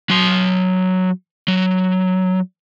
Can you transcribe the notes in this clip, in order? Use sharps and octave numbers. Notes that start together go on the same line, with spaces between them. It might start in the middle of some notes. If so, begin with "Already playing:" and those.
F#3 C6
F#3